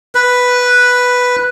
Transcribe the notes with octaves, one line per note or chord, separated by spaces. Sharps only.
B4